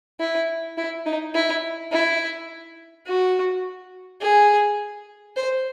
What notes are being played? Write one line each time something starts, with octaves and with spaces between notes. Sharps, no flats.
E4
E4
D#4
E4
E4
F#4
G#4
C5